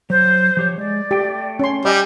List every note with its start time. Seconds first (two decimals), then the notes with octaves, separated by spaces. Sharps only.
0.10 F#3 C5
0.57 F3 G4 C#5
0.78 G#3 D5
1.11 A3 G4 G5
1.59 C#4 C6
1.85 G3 D5 D#5 G#5